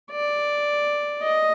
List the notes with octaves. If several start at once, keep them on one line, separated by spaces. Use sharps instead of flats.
D5
D#5